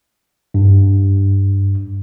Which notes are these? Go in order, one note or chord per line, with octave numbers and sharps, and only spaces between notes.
G2